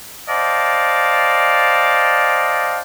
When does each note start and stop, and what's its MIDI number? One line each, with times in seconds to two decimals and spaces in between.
0.28 2.81 72
0.28 2.81 74
0.28 2.81 75
0.28 2.81 77
0.28 2.81 79
0.28 2.81 81